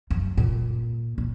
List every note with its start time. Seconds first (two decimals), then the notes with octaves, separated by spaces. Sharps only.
0.10 F#2
0.37 A#2
1.18 A#2